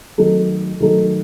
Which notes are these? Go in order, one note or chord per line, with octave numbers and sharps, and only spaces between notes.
D#3 F#3 A3 D#4 A4
D#3 F#3 A3 D#4 A4